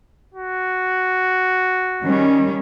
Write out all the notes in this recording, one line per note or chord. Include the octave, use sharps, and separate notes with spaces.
F#4
D#3 G3 C#4